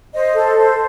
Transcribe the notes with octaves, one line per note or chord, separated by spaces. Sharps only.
C5 D#5
A4
C5